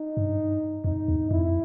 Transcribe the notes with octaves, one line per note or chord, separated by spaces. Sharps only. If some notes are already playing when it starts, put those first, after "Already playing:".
Already playing: D#4
G2
F2 D#4
E2
F2 E4